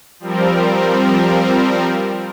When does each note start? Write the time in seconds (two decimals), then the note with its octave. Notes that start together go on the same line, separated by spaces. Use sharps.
0.20 F3 G3 C4 A#4